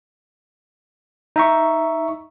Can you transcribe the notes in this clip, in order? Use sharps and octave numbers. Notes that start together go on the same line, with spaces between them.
D#4 E5 C#6